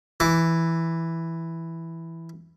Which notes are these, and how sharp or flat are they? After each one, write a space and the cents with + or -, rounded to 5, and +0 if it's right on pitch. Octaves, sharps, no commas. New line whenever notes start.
E3 +0 D6 -10